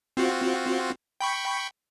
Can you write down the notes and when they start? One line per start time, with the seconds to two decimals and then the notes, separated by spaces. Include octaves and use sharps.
0.17 C4 F4 F#4
1.21 G5 B5 C#6